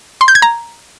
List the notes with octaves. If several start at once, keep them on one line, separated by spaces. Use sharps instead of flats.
C6
G6
G#6
A#5